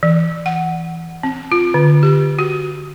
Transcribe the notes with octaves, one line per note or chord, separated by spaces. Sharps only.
E3
F#5
C4
F4
D3
G4
F#4